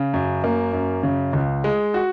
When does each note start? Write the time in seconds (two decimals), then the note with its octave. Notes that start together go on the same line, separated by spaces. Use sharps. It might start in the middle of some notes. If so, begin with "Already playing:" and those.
Already playing: C#3
0.14 F#2
0.44 A#3
0.73 F#2
1.03 C#3
1.33 C#2
1.64 G#3
1.94 F#4